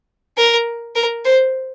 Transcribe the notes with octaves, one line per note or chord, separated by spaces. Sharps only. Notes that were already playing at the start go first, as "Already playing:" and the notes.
A#4
A#4
C5